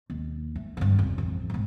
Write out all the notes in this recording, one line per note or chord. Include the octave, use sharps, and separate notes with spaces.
D#2
A3
G2 D3
F1 C#2
A1 F2
D#1 G#2